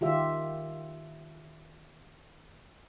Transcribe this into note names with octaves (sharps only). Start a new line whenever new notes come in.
D#3 F4 G4 E5